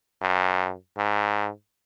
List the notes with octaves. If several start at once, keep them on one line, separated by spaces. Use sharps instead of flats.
F#2
G#2